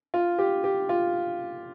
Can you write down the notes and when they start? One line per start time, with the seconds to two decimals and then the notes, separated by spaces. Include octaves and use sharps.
0.14 F4
0.39 G4
0.64 G4
0.89 F4